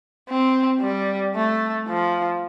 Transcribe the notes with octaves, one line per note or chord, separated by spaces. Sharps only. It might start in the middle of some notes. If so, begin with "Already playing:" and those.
C4
G3
A3
F3